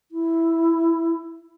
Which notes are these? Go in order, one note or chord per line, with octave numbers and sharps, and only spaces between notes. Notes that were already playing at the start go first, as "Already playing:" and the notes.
E4